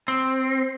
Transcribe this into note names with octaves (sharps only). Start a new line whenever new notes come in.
C4